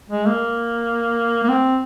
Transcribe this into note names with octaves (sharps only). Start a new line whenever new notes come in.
G#3
A#3
A#3
C4